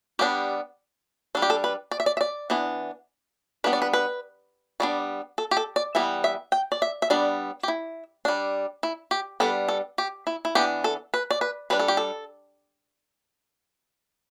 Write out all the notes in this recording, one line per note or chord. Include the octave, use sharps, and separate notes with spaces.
G3 B3 D4 G4
G3 D4 A4
G4
A4
B4
D5
E5
D5
E5
D5
E3 B3 D4
G3 B3 D4 B4
D5
B4
B4
G3 B3 D4 D5
A4
G4
A4
D5
E3 G3 B3 E5
E5
G5
D5
E5
E5
G3 B3 D4 D5
G4
E4
G3 D4
E4
G4
G3 B3 D4 A4
A4
G4
E4
E4
E3 B3 D4 G4
A4
B4
D5
B4
G3 D4 B4
A4
G4
A4